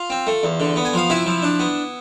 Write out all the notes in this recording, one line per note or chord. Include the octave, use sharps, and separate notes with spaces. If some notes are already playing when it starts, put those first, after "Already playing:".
Already playing: F4 F5
C4
A3
E2
D3
B3
G#5
F3 F5
C3 E4 E5
F3
D4
B3